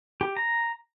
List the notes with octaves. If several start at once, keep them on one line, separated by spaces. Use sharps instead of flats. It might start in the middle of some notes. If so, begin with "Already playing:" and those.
G4
A#5